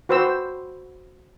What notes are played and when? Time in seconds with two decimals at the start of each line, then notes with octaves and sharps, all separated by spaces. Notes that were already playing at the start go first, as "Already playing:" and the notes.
0.09 F#4 B4 C5 G5 E6